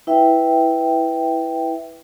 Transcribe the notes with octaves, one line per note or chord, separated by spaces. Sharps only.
E4 B4 E5 G5